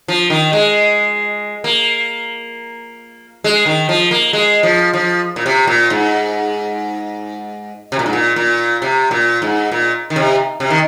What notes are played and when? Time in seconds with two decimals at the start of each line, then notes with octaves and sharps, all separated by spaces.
0.08 F3
0.30 D#3
0.53 G#3
1.64 A#3
3.44 G#3
3.66 D#3
3.89 F3
4.11 A#3
4.33 G#3
4.63 F3
4.94 F3
5.36 A#2
5.46 C3
5.67 A#2
5.90 G#2
7.92 C3
7.99 A#2
8.06 G#2
8.13 A#2
8.36 A#2
8.82 C3
9.11 A#2
9.42 G#2
9.72 A#2
10.10 D#3
10.16 C3
10.60 C3
10.70 D#3